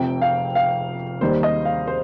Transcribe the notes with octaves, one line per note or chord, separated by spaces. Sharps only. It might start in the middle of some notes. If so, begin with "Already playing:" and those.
Already playing: F1 F2 C3 G5
F5
F5
D#2 D#3 G3 A#3 C5
D#5
F5
C5